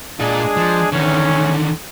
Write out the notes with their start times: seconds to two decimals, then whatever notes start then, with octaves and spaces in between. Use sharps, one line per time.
0.20 A#2 G#3 D4 F4 G#4
0.57 F3
0.92 E2 D3 D#3 C#4